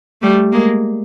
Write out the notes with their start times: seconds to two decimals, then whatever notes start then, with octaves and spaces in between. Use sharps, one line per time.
0.22 G3 A3
0.52 G#3 A#3